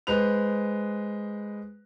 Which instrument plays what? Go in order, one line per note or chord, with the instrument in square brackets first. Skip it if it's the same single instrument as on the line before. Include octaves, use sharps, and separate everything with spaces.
[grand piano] G#3 B4 C5 F#6 F7